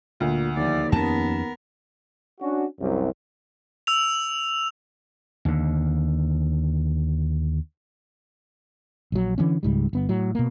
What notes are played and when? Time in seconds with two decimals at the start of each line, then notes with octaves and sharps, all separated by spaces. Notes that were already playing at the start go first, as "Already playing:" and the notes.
0.20 D2 A#2
0.56 D#2 F3 D5
0.92 F2 B3 C#4 A#4 A5
2.41 C#4 D4 F#4
2.81 C2 F#2
3.87 E6 F7
5.45 D#2 D3
9.12 A#1 F#3
9.38 D3 E3 B3 C#4
9.63 C#2 G#2 G3
9.93 G1 B3
10.09 A2 F#3
10.35 B2 A#3